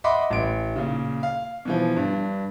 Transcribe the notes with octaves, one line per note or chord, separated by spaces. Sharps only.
D#5 E5 F#5 B5 C6 D6
A1 D7
A#2 C#3
F5
B2 E3 F3
G2 D4